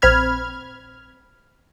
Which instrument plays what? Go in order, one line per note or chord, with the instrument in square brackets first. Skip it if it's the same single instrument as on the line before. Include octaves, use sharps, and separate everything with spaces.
[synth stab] A#1 C4 B5 F6 G#6